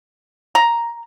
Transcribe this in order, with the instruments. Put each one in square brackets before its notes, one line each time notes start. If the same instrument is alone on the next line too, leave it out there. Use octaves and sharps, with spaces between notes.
[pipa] A#5